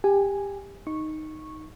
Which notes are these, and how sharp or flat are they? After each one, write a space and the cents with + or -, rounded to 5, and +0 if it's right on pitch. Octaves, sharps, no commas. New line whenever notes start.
G4 +20 G#5 +0
D#4 +0 C#6 -10